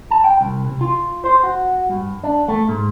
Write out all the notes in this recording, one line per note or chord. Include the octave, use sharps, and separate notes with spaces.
A5
G5
C2
C3
F4
C5
F#4
G2
D4
A3
G#2